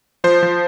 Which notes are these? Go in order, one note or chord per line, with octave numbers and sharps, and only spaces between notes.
F3 C5
F3